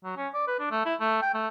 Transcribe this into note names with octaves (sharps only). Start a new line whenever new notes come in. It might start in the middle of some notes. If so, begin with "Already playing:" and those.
F#3
C#4
D5
B4
D4
A3
E4
A3
G5
A3